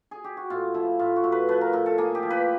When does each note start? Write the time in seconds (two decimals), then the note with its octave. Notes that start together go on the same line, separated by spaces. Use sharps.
0.11 G#4
0.24 G4
0.37 F#4
0.50 A2 F4
0.74 F3 E4
0.99 A2 F4
1.16 F#4
1.24 A2
1.32 B4
1.49 F3 B4
1.61 A#4
1.73 A2 A#4
1.86 A4
1.98 A#3 G#4
2.15 G4
2.23 F3
2.30 B4